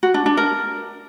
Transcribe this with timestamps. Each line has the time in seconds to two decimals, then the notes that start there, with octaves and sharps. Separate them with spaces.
0.03 F#4
0.14 D4
0.26 D4
0.37 A#4